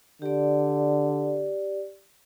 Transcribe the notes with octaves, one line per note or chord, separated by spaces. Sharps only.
D3 G4 D5